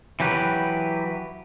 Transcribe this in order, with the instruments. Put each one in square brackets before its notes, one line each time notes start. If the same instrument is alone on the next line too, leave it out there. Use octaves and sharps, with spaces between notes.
[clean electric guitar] E3 F#3 G4 B4